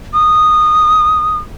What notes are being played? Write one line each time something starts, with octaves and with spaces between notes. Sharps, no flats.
D#6